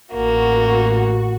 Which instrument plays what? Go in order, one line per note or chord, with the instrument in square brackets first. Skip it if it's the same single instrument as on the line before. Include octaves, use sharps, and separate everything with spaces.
[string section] A1 F#4 [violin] A#3